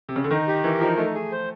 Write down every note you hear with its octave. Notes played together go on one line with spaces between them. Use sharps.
C3
C#3
D3
D#3 D#4
G4
E3 A#4
F3 D#4
A3 D#4
G#4
C5